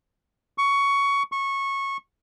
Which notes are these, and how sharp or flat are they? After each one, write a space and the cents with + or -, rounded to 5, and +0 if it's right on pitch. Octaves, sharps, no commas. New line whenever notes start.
C#6 +15
C#6 -15